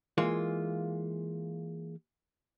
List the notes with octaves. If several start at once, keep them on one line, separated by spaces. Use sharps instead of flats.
E3 G#3 A#3 F4